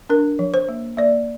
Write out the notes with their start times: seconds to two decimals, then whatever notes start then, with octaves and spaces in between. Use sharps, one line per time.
0.10 D4 A#4
0.39 F3
0.54 C5
0.69 A#3
0.97 A#3 D5